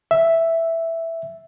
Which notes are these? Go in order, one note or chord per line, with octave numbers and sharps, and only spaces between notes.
E5